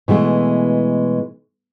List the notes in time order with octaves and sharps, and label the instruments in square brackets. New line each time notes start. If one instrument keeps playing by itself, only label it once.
[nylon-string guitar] B2 E3 G#3 A3